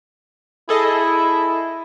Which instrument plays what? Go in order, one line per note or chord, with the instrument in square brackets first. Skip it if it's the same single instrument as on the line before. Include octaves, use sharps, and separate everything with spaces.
[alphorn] E4 [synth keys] G#4 A4 D#5